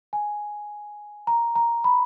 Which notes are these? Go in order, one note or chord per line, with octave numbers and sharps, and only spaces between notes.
G#5
A#5
A#5
B5